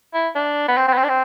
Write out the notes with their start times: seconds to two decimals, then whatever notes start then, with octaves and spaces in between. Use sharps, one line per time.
0.14 E4
0.35 D4
0.69 B3
0.77 C4
0.88 C4
0.93 B3
0.98 C4
1.03 D4
1.09 C4